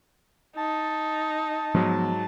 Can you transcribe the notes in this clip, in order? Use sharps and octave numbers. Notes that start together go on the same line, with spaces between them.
D#4 A5
G#2 F3 F#3 B3